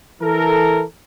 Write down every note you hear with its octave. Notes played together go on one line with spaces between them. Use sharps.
E3 A4 A#4